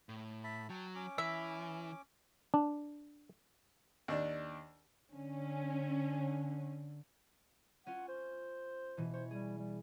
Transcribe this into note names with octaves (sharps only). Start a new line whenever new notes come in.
A2
E5 A5 B5
F#3 G5 A5
C#4 D6
E3 E5
D4
D#2 D4 D5
D3 C#4
C#4 F4 F#5
C5
B2 E3
C5 C#5
G3 G#4
G3